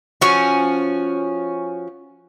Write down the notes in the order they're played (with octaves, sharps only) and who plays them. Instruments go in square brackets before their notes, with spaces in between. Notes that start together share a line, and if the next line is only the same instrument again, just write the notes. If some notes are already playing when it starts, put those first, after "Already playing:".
[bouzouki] F3 C#4 F#4